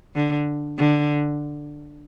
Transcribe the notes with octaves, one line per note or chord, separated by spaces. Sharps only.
D3
D3